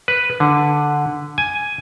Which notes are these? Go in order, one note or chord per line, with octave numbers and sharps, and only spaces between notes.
B4
D3
G#5